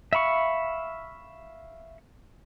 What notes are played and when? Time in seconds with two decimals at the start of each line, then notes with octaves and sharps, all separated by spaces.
0.13 E5 F5 B5 C#6